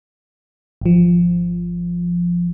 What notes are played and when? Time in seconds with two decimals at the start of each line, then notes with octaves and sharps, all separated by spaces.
0.81 G#1 F3